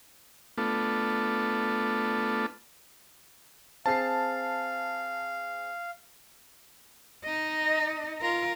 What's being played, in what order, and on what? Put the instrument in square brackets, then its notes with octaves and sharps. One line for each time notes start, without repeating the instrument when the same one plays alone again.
[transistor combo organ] A3 B3 D4 F4 A4
[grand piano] C4 G#4 C7 [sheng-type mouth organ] F5 [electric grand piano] A5
[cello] D#4 D#5
F4 A#4